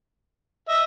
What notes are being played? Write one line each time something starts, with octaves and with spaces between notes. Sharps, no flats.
D#5 E5 E6